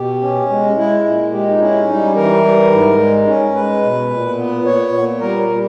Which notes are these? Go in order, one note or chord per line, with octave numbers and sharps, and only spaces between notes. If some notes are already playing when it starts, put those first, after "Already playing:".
Already playing: B2 G4
C#4
G#3
G#3 E4
A#2
G#3 G4
D#4
C#4 E4
G3 D#4
E3 A#4
G3
G#2
G#3
C#4
G#3 B4
B2
A#2
B3
A#2 C#5
A#2
G3 A#4
G3